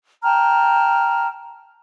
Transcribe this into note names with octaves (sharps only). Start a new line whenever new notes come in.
G5 A5 A#5 F6